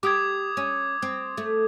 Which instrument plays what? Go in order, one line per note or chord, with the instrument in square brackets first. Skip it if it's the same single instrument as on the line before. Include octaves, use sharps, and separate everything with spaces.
[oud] G4 [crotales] D6 D#6 G#6
[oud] C#4
C4
A3